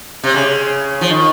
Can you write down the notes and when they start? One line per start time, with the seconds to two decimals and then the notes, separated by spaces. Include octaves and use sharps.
0.24 C3
0.34 C#3
1.01 F3
1.10 D#3